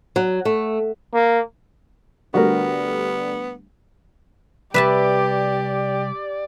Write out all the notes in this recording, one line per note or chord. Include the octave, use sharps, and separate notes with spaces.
F#3
A3
A#3
D3 G3 A3 B3 F#4 A#4
C2 G4 B4 D5 E5 A5